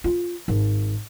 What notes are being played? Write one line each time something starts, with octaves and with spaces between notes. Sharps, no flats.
F4
G#1